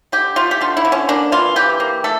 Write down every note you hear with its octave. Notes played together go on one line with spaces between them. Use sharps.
D3 G4
A3 F4
G4
D3 F4
E4
D3
C#4
A#3 D4
E3 F4
E3 G4
A#3
A3 A4